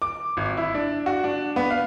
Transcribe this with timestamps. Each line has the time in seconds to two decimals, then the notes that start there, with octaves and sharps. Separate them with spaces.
0.02 D6
0.37 G#1
0.57 E4
0.74 D4
1.06 F#4
1.24 D4
1.56 B3
1.70 F5